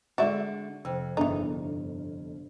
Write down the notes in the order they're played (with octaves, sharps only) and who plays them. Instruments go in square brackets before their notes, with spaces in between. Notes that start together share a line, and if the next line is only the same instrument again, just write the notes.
[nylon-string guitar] D3 G#3 D4 [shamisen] F#4 D5 E5
[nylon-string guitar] F2 [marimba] C3 G5
[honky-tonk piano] G1 [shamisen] E3 D#4